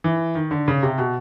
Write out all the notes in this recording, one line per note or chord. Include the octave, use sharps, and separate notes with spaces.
E3
D#3
D3
C#3
C3
B2